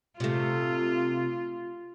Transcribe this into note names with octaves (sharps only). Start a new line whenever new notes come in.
C3 A3 F4